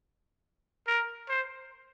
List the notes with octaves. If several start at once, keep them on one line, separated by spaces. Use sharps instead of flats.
A#4
C5